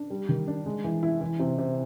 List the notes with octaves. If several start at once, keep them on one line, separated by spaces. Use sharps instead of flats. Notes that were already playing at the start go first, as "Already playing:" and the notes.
Already playing: D4
G3
D#3
D4
G#3
E3
E4
E3
C3
C3